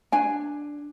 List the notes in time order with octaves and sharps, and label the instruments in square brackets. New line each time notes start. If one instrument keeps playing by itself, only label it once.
[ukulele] D4 G#5